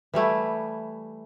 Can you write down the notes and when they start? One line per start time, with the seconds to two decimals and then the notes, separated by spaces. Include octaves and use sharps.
0.14 E3 G3 A3 E4